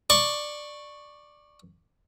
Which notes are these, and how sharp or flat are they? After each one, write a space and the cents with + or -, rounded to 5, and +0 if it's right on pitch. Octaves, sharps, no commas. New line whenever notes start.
D5 +10 C#6 -5